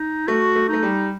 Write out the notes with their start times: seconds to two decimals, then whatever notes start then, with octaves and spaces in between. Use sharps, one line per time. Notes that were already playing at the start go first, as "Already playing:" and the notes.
Already playing: D#4
0.28 A3 F#4
0.56 A3
0.69 A3 D#4
0.83 G3